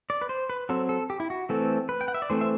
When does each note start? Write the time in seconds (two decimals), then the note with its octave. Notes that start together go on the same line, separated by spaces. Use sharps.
0.10 D5
0.22 B4
0.29 C5
0.50 B4
0.69 F#3 C4 A4
0.89 A4
1.10 G4
1.20 E4
1.30 F#4
1.49 E3 A3 C4 A4
1.89 B4
2.01 G5
2.08 F#5
2.14 E5
2.22 D5
2.30 E3 A3 C4 C5
2.41 E5